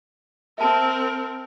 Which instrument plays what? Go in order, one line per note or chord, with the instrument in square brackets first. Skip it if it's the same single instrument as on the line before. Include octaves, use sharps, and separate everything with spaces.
[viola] C4 A#4 [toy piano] E5 A5